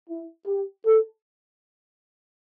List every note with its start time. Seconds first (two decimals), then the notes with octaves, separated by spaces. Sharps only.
0.09 E4
0.47 G4
0.86 A4